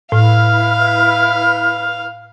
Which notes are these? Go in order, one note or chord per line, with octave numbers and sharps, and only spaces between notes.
A2 E4 B4 F5 F6